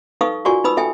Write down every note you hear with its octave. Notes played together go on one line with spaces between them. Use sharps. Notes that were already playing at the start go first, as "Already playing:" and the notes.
D#4 A4 B4 F5 C#6 D#6
F4 F#4 A#4 D5 G#5 C#6
D#4 B4 B5 D#6 E6
A4 E5 G5 G#5